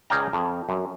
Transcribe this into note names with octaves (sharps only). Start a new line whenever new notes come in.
C#2 G#4 D5 F5 G5 A#5
F2
F#2